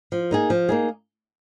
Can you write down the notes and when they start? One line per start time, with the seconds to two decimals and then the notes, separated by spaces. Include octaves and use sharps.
0.12 F3
0.31 A#3 D#4 G#4
0.50 F3
0.69 A#3 D#4 G#4